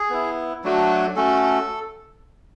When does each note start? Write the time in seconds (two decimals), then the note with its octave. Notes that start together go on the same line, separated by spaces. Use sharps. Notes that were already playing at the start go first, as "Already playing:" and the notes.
Already playing: G#4
0.10 B3 E4
0.64 F#3 A3 D4 F#4
1.16 A3 C#4 F#4 A4